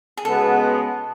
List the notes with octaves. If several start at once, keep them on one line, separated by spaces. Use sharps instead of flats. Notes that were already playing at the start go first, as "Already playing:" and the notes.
G#4
C#3 G#3 B3 F#4 A4